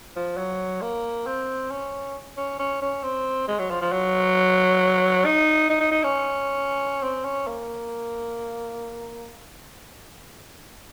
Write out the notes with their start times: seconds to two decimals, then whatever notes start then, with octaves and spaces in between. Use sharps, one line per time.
0.16 F3
0.37 F#3
0.82 A#3
1.26 C4
1.71 C#4
2.37 C#4
2.59 C#4
2.82 C#4
3.03 C4
3.48 G#3
3.59 F#3
3.70 F3
3.81 F3
3.92 F#3
5.25 D#4
5.70 D#4
5.81 D#4
5.91 D#4
6.04 C#4
7.03 C4
7.25 C#4
7.47 A#3